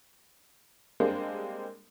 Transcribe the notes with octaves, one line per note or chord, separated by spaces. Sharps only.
G3 G#3 A#3 C4 D4 G#4